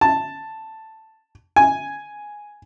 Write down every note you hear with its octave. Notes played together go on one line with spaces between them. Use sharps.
A5
G#5